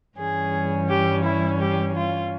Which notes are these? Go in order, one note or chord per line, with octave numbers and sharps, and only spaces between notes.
G2 E3 G3 C#4 G#4
G4
E4
G4
F4